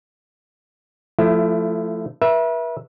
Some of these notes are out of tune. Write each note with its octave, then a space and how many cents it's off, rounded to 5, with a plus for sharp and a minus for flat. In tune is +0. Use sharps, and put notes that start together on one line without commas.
F3 +0 A3 +0 E4 +25
B4 -40 E5 +0